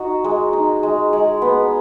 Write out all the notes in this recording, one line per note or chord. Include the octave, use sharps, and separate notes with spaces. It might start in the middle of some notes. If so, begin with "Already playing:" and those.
Already playing: D#4 F#4
G#3
D#4
G#3
G#3
B3